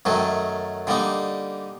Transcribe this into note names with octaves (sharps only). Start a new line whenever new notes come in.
F#2 D#3 F#3 A3
D3 G3 A#3 D#4